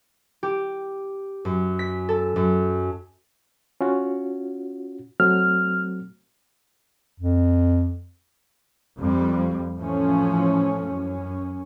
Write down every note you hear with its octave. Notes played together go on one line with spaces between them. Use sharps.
G4
F#2
B6
A4
F#2
C#4 F4 F#4
F#3 A3 C4 F6
F2
F2 G3
A2 E3 F3 A3 C#4
F#2 C#4